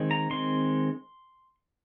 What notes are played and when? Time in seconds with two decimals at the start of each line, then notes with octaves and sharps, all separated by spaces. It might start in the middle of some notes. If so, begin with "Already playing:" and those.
Already playing: D#3 G#3 C4
0.11 A#5
0.30 D#3 G#3 C4 C6